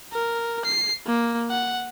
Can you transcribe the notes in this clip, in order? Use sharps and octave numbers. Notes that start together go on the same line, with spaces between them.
A#4
C7
A#3
F#5